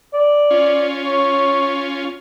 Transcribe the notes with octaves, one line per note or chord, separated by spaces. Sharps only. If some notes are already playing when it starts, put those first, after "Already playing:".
D5
C#4 F4
C#5